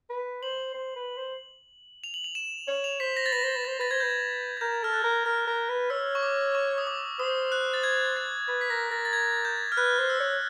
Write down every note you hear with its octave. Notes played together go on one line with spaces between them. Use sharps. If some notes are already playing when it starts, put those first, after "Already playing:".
B4
C5 F#7
C5
B4
C5
F7
F#7
F7
E7
C#5 F#7
F7
C5 B6
A#6
A6
B4 A#6
C5
B4
A6
C5
B4 A6
C5 G#6
B4 G6
G#6
G#6
A#4 G6
A4 F6
F#6
A#4
A#4 F6
A#4
B4
C#5 E6
C#6
D6
C#6
D#6
D6
C5 D#6
F#6
A6
G#6
A6
B4 A6
B6
A#4 A#6
A#4 A6
A6
G#6
G6
F6
B4 F#6
C5
E6
C#5